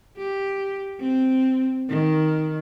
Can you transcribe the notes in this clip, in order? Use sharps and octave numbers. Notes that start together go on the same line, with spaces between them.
G4
C4
D#3